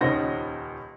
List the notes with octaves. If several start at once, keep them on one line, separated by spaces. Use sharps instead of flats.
D#1 C#2 C#4 D#4 C5 A#6